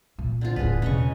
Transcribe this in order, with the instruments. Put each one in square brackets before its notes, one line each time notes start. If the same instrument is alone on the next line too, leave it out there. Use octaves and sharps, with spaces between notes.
[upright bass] A#2
[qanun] D3 C4 F4
[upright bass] D#1 A2 [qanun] G#4 B4
[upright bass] E1 [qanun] C#3 D#5 C#6